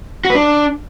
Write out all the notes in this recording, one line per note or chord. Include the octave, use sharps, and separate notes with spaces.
F#4
B4
D4